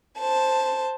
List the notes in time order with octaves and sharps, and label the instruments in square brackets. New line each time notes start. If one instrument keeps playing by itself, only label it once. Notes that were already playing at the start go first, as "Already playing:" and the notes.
[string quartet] C5 A5